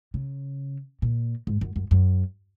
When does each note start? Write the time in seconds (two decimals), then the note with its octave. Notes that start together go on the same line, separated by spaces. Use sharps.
0.14 C#3
1.02 A#2
1.47 G#2
1.61 F#2
1.76 F#2
1.91 F#2